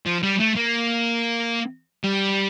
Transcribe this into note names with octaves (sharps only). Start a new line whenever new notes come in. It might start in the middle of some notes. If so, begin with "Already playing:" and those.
F3
G3
A3
A#3
G3